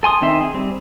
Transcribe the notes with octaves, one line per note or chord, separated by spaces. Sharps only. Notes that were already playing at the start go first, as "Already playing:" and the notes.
A4 G#5 C6 D#6
D#3 C4 D#4 E5 C6
G#4
G3 C4